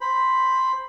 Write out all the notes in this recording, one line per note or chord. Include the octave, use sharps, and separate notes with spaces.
C5 B5